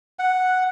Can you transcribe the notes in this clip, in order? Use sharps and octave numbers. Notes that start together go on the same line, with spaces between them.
F#5